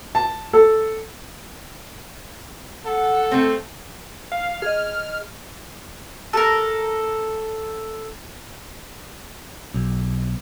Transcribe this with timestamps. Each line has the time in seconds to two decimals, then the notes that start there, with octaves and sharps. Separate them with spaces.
0.15 A5
0.53 A4
2.85 A4 F#5
3.31 A3 C4
4.32 F5
4.62 G#4 D#5 F6
6.33 A4 A#4
9.74 B1